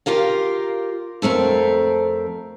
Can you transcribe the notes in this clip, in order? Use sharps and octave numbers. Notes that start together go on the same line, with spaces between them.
F4 G4 A#4 F5
F2 A3 C4 A#4